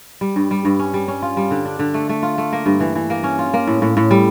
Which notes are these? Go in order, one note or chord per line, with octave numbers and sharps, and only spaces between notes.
G3
G2
G3
G2
C#4
G3
C#4
F4
G3
D3
D4
D3
A3
A3
F4
A3
A#3
G2
E3
E3
A#3
C#4
F4
A#3
A2
A2
A2
G3